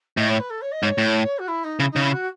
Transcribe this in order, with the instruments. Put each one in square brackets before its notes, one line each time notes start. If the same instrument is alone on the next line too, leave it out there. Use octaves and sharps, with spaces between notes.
[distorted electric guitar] A2 [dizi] D#5
[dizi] C#5
B4
A4
C#5
D#5
[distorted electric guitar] G#2 [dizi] C#5
[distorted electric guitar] A2
[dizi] F#4
E4
D#4
[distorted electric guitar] C#3 [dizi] E4
[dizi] D#4
[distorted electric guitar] C#3
[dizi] E4
F#4